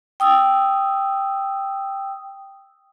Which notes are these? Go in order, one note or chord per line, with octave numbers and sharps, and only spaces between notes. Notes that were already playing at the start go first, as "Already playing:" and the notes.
G5 D#6 E6